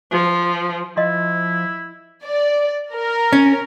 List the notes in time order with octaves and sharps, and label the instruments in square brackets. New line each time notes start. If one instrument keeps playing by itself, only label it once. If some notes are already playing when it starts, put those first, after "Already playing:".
[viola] F3
[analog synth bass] F3 [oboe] E4 [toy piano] D#5 C6
[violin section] D5
A#4
[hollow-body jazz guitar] C#4